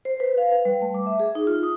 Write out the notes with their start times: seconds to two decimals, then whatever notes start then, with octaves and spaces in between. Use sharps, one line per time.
0.05 C5
0.20 B4
0.38 F5
0.51 B4
0.65 G3
0.82 A3
0.94 D6
1.07 E5
1.20 G#4
1.35 D#4
1.47 F4
1.63 D#6